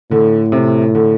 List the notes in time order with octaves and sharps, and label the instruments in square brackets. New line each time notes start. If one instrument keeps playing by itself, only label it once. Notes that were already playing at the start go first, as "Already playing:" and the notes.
[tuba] A2 [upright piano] D3
[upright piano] C3
D3